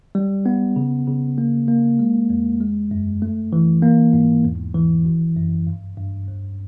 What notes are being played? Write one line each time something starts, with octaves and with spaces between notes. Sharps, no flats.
G3
B3
C#3
C#3
A#3
A#3
G#3
E2
G#3
F#2
A3
E3
A#3
G#2
E2
E3
G#1
F#2
G2
G2
D2